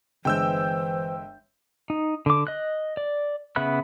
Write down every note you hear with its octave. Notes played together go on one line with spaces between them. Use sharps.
G1 E3 G#3 C5 G5 E6 G6
D#4
D3 D6
D#5 F#6
D5
C#3 B3 E5 B5 F#6